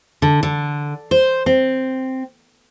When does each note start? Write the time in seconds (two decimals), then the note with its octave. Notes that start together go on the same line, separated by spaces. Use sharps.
0.22 D3
0.43 D3
1.11 C5
1.46 C4